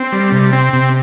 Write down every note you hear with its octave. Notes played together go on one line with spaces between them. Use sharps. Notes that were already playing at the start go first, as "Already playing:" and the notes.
Already playing: C4
G3
C3
C4
C3